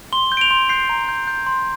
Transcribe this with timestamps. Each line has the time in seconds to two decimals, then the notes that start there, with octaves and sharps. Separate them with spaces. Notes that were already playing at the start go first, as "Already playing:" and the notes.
0.13 C6 G7
0.32 G6
0.37 D7
0.41 F7
0.51 C6
0.69 G6 C7
0.89 A#5
1.09 G6
1.27 G6
1.47 C6